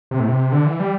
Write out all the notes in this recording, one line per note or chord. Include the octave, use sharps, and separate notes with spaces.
C3
A2
C3
D3
E3
G3